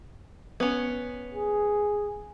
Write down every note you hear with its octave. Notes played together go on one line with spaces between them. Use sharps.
B3 C#4
G#4